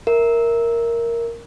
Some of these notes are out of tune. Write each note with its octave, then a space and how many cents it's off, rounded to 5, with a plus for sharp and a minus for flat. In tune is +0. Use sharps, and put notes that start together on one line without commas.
A#4 +0 E5 +0